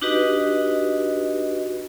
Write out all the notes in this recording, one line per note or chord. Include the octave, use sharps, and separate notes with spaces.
D4 D#4 F#4 G4 B4 D#5